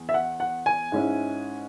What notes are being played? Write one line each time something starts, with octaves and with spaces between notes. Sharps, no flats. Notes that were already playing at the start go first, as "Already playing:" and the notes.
Already playing: E2
E5
F#5
F#5
G#5
G#2 G#3 C#4 E4